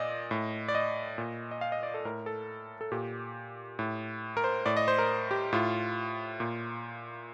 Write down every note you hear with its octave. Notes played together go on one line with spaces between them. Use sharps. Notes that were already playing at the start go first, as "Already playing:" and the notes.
Already playing: A#2 D5 D#5
A2
D5
D#5
A#2
D#5
F5
D#5
D5
A4
A2 A#4
A4
A4
A#2 G4
A2
A#4
C5
A2 D5
D#5
C5
A#4
G4
A2 F4
A#2